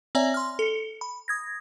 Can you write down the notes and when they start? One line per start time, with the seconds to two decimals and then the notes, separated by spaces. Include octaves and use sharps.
0.15 C4 C#5 D5 E5 G#5 A#5
0.34 C6 F6
0.59 A4 C#7
1.01 B5
1.28 D#6 G#6 A#6